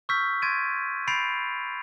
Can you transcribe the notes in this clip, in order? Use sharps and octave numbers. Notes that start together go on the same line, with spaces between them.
C#6 E6 F6 G6 B6
C6 G#6 A6 D7 D#7
B5 G6 A6 C7 D7 F7